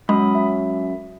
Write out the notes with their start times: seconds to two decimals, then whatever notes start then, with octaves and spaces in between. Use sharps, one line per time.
0.09 F#2 G#3 B5 D#6
0.35 E5